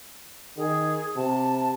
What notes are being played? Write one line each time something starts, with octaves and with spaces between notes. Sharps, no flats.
D#3 G#4
C3 A5